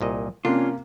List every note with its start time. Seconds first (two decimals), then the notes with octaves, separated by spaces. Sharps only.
0.01 C2 A#2 D#5
0.45 C3 A#3 C#4 D4 F4